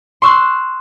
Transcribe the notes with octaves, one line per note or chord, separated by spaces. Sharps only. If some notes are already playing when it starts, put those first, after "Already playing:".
C6 C#6 E6 F#6